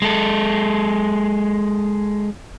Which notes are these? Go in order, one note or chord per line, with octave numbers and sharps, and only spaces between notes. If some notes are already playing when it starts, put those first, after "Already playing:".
G#3 A4